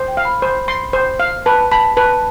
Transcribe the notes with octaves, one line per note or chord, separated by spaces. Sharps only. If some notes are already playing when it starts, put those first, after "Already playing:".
Already playing: C5
G5
F5
B5
C5
C6
C5
F5
B4 A5
A5 B5
B4 A5